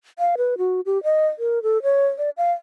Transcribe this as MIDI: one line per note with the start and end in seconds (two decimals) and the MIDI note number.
0.19 0.35 77
0.38 0.58 71
0.58 0.81 66
0.86 1.02 67
1.04 1.27 75
1.39 1.62 70
1.63 1.82 69
1.83 2.07 73
2.18 2.30 74
2.37 2.52 77